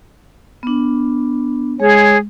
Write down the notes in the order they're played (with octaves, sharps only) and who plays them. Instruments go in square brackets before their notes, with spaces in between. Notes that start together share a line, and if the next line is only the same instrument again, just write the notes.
[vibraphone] B3 D4
[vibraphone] G#3 [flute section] G#4 C#5